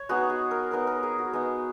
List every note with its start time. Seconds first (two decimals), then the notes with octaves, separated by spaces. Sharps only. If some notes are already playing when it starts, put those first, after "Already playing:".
Already playing: C#5
0.09 G#3 B3 D#4 F#4
0.30 G#4
0.51 A#4
0.71 G#3 B3 D#4 A#4
0.87 A#4
1.03 G#4
1.18 F#4
1.33 G#3 B3 D#4